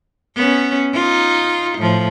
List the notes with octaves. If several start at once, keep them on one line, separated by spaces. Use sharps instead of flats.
B3 C#4
D#4 F4
A2 F3